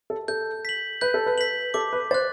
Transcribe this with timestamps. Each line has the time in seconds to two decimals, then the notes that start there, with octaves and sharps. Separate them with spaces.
0.10 A4
0.28 A4 G6
0.65 B6 F#7
1.01 B4 G6
1.14 A4
1.26 B4
1.38 B6 F#7
1.74 A4 D6
1.93 B4
2.11 C5 F#6 A6